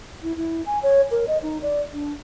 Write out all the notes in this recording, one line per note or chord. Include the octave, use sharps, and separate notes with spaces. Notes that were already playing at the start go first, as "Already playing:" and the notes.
E4
E4
G#5
C#5
A#4
D#5
D#4
D5
D4